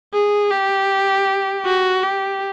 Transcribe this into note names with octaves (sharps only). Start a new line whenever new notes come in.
G#4
G4
F#4
G4